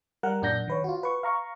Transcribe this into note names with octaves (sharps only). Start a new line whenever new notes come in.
G3 A#4 F#5
F#2 A#2 D4 F#5 G6 A#6
D#3 B4 C#5
F4 F#4
B4 C#6
F5 A#5 C#6